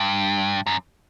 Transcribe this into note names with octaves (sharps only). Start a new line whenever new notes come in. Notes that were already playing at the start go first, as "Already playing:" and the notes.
Already playing: G2
F#2